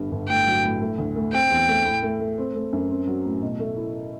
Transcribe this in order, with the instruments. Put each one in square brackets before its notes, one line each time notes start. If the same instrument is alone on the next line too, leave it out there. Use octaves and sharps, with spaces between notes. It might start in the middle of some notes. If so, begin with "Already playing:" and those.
Already playing: [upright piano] G1 G2
G1
[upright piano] A2 [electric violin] G5
[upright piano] F#3
A2
A3
D2
A3
[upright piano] C4 [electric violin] G5
[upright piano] E2
A3
A2
A3
A3
C4
A3
F#2
C4
F#3
A2
B2
A3
E4